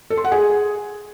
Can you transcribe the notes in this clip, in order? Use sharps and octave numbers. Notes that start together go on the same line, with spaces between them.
A4
C6
F#5
G#4